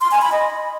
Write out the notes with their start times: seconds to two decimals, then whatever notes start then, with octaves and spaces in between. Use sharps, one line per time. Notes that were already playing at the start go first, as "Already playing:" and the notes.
0.01 C6
0.11 G#5
0.22 B5
0.32 D#5